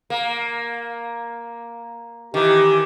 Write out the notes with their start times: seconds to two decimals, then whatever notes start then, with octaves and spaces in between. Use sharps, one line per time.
0.10 A#3
2.34 D#3 E3 G4